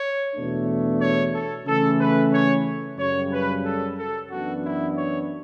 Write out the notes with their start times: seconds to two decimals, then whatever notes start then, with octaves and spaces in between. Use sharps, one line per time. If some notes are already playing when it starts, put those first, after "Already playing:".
Already playing: C#5
0.35 E2 B2 A3 D4
1.00 C#5
1.33 A4
1.66 C#3 E3 A3 A4
2.00 B4
2.32 C#5
2.98 F#2 C#3 G3 C#5
3.32 B4
3.64 A4
3.97 A4
4.30 F#2 E3 B3 D4 F#4
4.64 E4
4.96 C#5